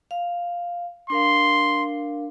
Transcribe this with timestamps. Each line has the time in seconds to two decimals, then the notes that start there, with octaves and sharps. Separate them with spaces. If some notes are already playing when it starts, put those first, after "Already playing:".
0.11 F5
1.10 D4 A#4 F5 C6